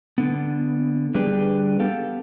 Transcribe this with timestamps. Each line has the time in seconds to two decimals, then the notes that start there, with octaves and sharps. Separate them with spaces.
0.18 D3 B3
1.15 D3 G3 D4 G4 G#4 B4
1.80 B3 G4 A4 F5